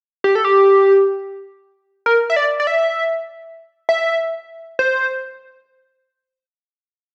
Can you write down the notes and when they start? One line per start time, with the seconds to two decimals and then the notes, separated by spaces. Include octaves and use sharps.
0.24 G4
0.35 A4
0.45 G4
2.06 A#4
2.30 E5
2.36 D5
2.60 D5
2.67 E5
3.89 E5
4.79 C5